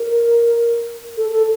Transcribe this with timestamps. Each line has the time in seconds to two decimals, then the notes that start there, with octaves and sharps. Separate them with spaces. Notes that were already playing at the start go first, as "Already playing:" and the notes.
Already playing: A#4
1.17 A4
1.30 A4